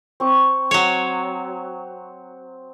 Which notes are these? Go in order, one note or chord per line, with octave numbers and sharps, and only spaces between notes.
C4 C#6 D6
F#3 C#5